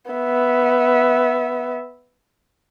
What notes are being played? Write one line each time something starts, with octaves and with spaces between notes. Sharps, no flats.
B3 E5